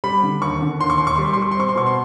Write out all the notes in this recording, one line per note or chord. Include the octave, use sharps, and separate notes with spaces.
G3 B5
D3
D#2 C#6
D3
D#2 C6
C#6
D#2 C6
C#6
G3 C6
C#6
G3 C6
C#6
C6
C4 C#6
C6
B2 C#6
C6